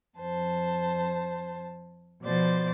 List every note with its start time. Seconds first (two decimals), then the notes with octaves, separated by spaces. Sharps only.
0.18 F2 C5 A5
2.22 B2 F3 C5 D5 A6